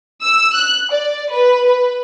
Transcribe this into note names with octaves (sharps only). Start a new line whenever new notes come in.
E6
F#6
D5
B4
B4